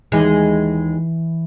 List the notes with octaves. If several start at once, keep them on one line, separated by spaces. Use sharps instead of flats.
D#2 E3 G#3